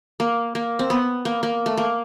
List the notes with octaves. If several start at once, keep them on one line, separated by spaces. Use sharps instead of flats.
A#3
A#3
C4
B3
A#3
A#3
A3
A#3